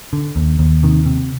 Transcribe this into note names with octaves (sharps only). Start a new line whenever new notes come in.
D3
D#2
D#2
C3 D#3
C3